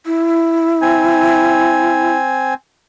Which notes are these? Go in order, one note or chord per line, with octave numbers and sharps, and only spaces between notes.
E4
C4 G#5